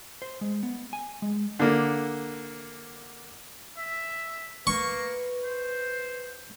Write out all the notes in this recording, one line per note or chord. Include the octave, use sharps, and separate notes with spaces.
C5
G#3
B3
G#5
G#3
D3 A#3
E5
A#3 B4 C#6
C5